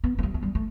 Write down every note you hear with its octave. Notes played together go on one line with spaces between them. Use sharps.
B3
A3
G3
A3
G3
A3